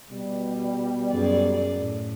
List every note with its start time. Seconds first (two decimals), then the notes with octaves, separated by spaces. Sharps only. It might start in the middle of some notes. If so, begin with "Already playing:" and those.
0.10 B2 G3
1.10 F#2 G#4 D5
1.78 A2